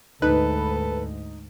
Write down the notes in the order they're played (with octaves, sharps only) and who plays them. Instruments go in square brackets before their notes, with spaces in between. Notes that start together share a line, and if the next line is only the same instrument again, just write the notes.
[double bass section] D2 G#2 [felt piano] D#4 [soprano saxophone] A4 [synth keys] B4